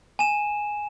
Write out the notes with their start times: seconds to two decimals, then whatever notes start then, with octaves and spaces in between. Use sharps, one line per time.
0.19 G#5 E7